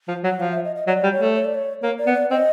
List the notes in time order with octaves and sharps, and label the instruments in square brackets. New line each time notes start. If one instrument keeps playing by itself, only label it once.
[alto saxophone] F3
F#3
[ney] F#5
[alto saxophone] F3 [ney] F5
[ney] E5
D#5
D#5
[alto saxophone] F#3 [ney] D5
[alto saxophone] G3
[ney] C#5
[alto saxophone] A3
[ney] C#5
D5
C#5
[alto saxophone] A#3 [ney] C#5
[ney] D5
[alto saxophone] B3
[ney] D5
[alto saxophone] C4 [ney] D#5